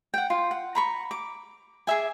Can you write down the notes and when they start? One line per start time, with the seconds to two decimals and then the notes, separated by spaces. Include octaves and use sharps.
0.14 F#5 G5
0.30 F4
0.51 F#5
0.75 A#5 B5 C#6
1.11 D6
1.87 G#4 D5 E5 G#5